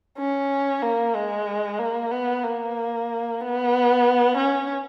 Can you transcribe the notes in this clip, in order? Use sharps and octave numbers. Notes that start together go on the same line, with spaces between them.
C#4
A#3
G#3
A#3
B3
A#3
B3
C#4